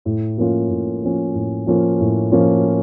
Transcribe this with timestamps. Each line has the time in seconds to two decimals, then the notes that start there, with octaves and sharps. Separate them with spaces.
0.05 A2
0.37 F3 A#3 C#4 F4
0.70 A2
1.02 F3 A#3 C#4 F4
1.35 A2
1.67 F3 A#3 C#4 F4
2.00 A2
2.32 F3 A#3 C#4 F4